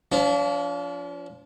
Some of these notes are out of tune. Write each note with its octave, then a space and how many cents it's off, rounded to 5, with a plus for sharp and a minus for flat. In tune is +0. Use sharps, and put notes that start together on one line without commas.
F3 +0 D4 -45